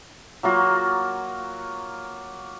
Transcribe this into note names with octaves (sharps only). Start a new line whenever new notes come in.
F#3 A#3 F4 F#4